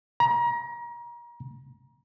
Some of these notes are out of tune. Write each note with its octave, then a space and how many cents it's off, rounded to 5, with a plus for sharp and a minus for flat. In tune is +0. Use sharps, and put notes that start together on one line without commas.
A#5 +35